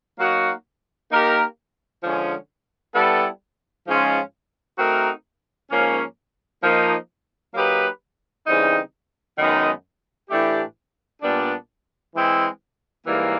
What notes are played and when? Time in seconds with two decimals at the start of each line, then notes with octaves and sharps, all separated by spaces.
0.18 F#3 A#3 D#4 F#4
1.11 A#3 D#4 G4 A#4
2.03 D3 F3 G#3 C#4
2.94 G3 B3 E4 A4
3.86 G#2 F3 G#3 C#4 F4
4.78 A3 C4 D#4 F#4 A#4
5.70 G#2 F3 A#3 C#4
6.62 F3 A#3 D#4
7.54 F#3 A#3 D#4 G4 B4
8.46 C#3 E3 G3 C4 D#4
9.38 F#2 D#3 G#3 B3 D#4
10.30 A2 E3 A3 D4 G4
11.22 A#2 G3 B3 D4
12.14 E3 G#3 C4 E4
13.06 G#2 E3 G3 A#3